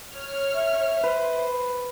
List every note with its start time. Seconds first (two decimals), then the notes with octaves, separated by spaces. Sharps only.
0.13 C#5 F6
0.55 E5
1.04 B4 C5